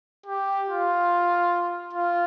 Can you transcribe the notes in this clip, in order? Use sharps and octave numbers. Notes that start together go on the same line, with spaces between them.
G4
F4
F4